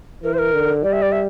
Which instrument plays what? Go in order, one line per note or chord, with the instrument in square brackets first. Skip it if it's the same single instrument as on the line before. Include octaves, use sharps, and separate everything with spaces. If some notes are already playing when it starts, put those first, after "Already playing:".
[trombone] E3 [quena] A#4
[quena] C5
A#4
[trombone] D3
[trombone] G3 [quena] D5
[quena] E5
D5
E5